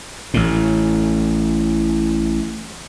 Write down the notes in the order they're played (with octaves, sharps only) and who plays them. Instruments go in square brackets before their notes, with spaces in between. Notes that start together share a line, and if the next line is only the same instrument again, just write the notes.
[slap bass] A1 A2